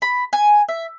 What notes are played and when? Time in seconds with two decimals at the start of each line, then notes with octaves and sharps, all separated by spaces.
0.02 B5
0.33 G#5
0.69 E5